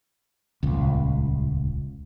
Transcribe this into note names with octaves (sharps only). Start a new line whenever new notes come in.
D#1 C#2